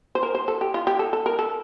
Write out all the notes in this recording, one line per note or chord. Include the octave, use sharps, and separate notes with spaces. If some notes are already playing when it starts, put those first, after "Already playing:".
C5
A#4
C5
A4
G4
F4
G4
A4
A4
A#4
A4